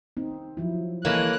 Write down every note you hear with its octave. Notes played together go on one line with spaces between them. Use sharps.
C4 D#4
F3 F#3 E4
C3 E3 G#3 A#3 A4 C#5 F#6